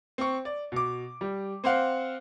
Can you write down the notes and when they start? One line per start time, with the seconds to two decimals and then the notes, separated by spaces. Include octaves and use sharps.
0.18 C4 C#6
0.45 D5
0.72 B2 D6
1.21 G3
1.64 C4 C5 F5 F#5